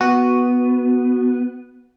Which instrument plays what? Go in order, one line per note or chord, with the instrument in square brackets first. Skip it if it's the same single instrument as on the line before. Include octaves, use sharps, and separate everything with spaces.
[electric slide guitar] B3 [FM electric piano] F#4